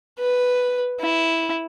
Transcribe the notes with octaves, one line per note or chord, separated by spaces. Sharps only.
B4
E4